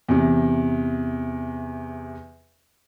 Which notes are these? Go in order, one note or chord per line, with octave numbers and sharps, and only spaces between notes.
E2 C3